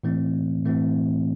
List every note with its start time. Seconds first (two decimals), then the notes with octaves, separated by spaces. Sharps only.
0.03 A2 E3 A3 C4
0.65 A2 E3 A3 C4